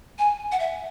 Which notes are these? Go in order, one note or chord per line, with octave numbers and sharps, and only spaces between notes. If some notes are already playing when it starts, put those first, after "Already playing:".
G#5
F#5
E5